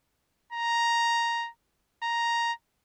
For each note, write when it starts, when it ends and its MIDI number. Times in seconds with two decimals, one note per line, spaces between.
0.52 1.49 82
2.03 2.52 82